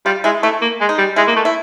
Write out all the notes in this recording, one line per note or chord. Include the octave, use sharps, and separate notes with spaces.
G3 F4
G#3 E4
A3 E4
A#3
G#3
D#4
G3
G#3 E4
A#3
A3
E4